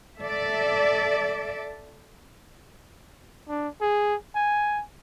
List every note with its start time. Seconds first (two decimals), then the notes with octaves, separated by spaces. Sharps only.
0.22 A4 D5 E5
3.48 D4
3.81 G#4
4.35 G#5